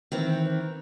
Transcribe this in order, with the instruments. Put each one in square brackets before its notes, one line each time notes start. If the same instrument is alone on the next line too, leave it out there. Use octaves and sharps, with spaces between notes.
[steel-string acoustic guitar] D#3 E3 C4